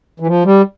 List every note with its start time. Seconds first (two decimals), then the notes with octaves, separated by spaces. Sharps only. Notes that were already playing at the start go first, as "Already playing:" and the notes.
0.20 E3
0.27 F3
0.45 G3